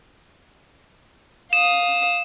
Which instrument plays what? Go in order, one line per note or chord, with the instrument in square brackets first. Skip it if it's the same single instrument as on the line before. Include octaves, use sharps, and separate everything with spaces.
[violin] F5 D#6 [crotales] E7